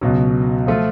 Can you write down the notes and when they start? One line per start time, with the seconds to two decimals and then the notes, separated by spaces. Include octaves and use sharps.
0.01 C#2 B2 F#3
0.67 F3 A3 F4